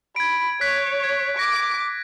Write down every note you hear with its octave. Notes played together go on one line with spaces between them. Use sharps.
B5 G#6 D7
C#5 F#6 B6
G#6
D6 A#6 D7